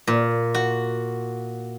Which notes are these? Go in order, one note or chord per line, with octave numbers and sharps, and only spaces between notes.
A#2
F#4